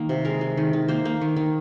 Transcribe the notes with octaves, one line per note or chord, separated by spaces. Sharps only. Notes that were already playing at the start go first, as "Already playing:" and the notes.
Already playing: D#3 A#3
C3
G#3 A#4
G#3
D#3
D#3
A#3 C5
A#3
D#3
D#3